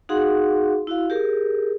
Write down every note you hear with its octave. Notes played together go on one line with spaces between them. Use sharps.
D#4 F#4 G#4 F5 F#5 C6
E4 F#4 F5
G4 G#4 A#4